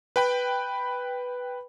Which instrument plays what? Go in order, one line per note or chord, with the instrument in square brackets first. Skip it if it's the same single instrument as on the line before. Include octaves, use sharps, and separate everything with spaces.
[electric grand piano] B4 G5 B5